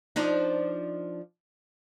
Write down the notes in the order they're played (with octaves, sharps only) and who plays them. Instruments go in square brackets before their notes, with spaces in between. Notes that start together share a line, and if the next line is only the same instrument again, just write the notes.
[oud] F3 D4 D#4